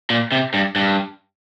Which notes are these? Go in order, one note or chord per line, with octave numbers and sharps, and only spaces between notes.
A#2
C3
G2
G2